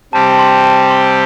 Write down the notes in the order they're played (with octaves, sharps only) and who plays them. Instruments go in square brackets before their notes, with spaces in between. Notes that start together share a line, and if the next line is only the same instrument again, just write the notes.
[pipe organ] C3 G3 C4 G4 [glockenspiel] A5
[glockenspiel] A5
C6
A5
C6